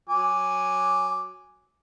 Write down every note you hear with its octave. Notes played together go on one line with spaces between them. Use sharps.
F#3 G#5 D6